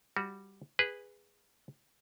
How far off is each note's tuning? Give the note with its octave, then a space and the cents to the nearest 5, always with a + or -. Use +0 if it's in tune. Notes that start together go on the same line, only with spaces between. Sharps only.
G3 +0 F#4 -5
G#4 -15 B4 +0